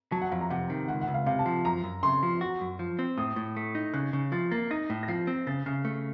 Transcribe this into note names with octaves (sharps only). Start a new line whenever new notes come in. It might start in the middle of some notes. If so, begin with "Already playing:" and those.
F#3 A5
F#5
F2 F5
A#5
C3 F#5
D#3
C#2 F#5
F#5
C#2
F5
C3 F5
A5
F3
F#2 A#5
F#2
C#3 C6
F3
F#4
F#2
F3
C4
A2 D#6
A2
A3
D#4
C#3 F#6
C#3
F3 A6
A#3 A6
D#4 A#6
A2
A#6
F3 C7
C4
C#3 A6
C#3 F6
A3